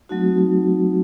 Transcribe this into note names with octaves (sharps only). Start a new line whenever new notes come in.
F#3 A3 C4 D#4 F#4